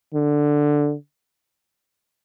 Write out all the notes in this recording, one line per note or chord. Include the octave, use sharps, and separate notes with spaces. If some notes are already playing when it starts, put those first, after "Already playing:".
D3